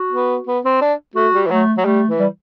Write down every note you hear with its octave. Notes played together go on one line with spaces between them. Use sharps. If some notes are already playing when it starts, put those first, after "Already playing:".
Already playing: F#4
B3
B3
C4
D4
A3 F#4
G3
E3
F#3 A3
F#3
G3 A3
E3
G3